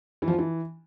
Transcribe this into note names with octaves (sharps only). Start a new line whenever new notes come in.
E3
F3
F4
E3